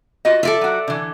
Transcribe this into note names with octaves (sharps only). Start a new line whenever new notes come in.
F4 F#4 D#5
F4 A4 D5 E5
F#3 F#4
D3 E3